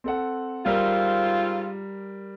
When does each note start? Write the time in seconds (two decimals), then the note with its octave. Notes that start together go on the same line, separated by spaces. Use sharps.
0.04 C4 A4 F#5
0.66 G#2 G3 C4 F4 A#4